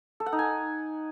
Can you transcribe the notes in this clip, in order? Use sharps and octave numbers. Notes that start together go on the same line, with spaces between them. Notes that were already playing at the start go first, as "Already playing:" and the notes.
A4
F#5
D#4
G#5